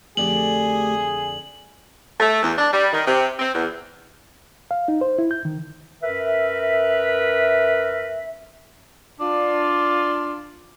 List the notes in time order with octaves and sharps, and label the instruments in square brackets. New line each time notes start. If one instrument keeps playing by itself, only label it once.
[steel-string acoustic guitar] F2 D3 D5 [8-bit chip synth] A3 G4 [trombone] G#4 [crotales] F#7
[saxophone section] A3
E2
D4
G3
D#3
C3
C4
E2
[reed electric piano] F5
D#4
C5
E4
G6
D#3
[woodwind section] F#2 A#4 B4 E5
[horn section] D4 F4